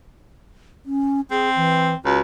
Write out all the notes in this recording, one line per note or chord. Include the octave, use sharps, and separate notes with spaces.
C#4
C4 G#4
E3
C#2 F#4